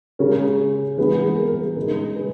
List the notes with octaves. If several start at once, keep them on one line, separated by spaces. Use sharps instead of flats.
C#3 G#3 C#4 A#4 C#5
E3 G#3 B3 G#4 B4
G#4
A#4
G#4
C#3 G#3 D#4 A#4
G#4 B4